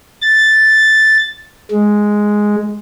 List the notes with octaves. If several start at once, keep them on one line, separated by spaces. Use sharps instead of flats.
A6
G#3